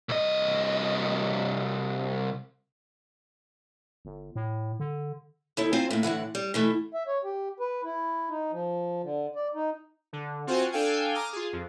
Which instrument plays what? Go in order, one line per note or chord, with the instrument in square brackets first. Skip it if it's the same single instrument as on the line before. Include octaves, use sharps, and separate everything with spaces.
[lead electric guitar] C2 D#5
[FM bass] G1
A2
D3
[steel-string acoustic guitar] D#2 E4 A4
C4 D#4 F4 C5 F5 G#5
A2 A#3
A2 D3 E3 F#5
G3
B2 E3 A3
[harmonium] E5
C#5
G4
B4
E4
D#4
F3
D3
D5
D#4
[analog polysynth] D3
C4 F4 F#4 C5 F#5 G#5
D4 A4 F5 G5 G#5
A#5 D6 D#6 F6
F4 G#4
F2